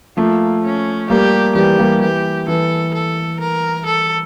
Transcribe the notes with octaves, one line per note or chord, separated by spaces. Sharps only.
F3 A3 A#3
C#4
G3 A#3 G4
E3 G3 G4
G3 A#3
E3 G4
E3 A4
A4
A#4
A4